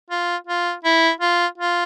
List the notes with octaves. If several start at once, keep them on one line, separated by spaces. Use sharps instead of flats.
F4
F4
E4
F4
F4